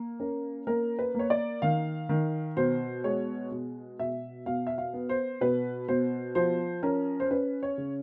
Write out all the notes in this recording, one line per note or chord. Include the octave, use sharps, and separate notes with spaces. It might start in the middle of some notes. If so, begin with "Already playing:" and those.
Already playing: A#3
C#4 A#4
A#3 A#4
B4
A#3 C#5
D5
D#3 F5
D#3
B2 C5
G#3 C#5
B2
B2 E5
B2 F5
E5
F5
B3
C5
B2 B4
B2 C5
F3 C5
C#4 A#4
C5
C#4 B4
C#5
C#3